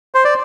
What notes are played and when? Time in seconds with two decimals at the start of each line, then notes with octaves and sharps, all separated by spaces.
0.14 C5
0.25 D5